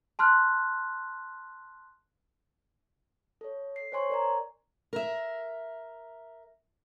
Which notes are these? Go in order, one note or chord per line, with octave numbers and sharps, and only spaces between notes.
A5 C6 F6 F#6
A4 C#5
C7
C5 C#5 G#5 C6 C#6
A#4 D5 A#5
A#4 E5